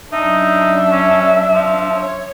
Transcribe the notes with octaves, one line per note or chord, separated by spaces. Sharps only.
F#2 D4 D#4 E5
C#4
F3
C#5